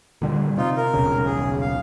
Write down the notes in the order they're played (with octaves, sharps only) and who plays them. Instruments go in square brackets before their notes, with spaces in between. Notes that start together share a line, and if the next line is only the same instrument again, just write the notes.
[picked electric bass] A#2 D3 G3
[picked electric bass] C3 [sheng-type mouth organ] D#4 F4
[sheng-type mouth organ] A#4
[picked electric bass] D#1 B1 C#3
[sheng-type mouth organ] G#4
F5